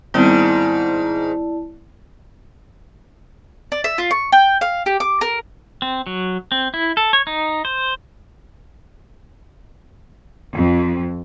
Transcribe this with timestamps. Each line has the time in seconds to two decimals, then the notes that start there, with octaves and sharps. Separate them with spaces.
0.14 G#2 D#3 G3 B3 C4 E4 D5 A5
3.72 D5
3.84 E5
3.98 F4
4.11 C#6
4.32 G5
4.61 F5
4.86 G4
5.00 D6
5.21 A#4
5.82 C4
6.07 F#3
6.52 C4
6.74 E4
6.97 A4
7.13 C#5
7.27 D#4
7.65 C5
10.54 F2